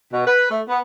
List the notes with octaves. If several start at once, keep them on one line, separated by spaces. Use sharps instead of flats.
B2
B4
A3
B3